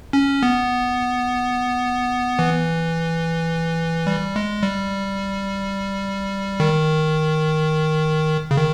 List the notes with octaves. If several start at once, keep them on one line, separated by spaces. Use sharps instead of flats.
C#4
B3
E3
G3
G#3
G3
D#3
C#3
D#3